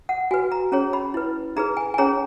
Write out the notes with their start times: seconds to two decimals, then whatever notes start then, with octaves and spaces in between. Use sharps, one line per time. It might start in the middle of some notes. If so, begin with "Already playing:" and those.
0.09 F#5
0.31 F#4 B4 G#5
0.52 A#5
0.72 C#4 G#4 C#5 A#5
0.93 B5
1.14 E4 B4
1.56 D#4 G#4 B4 A#5
1.77 G#5
1.94 G#5
1.98 C#4 G#4 C#5 A#5